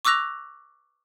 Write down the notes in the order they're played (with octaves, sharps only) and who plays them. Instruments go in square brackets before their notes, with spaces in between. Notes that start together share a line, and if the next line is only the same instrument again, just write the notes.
[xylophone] C#6 D6 E6 F#6 A#6 F7